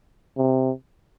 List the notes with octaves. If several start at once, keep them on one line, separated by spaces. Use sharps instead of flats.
C3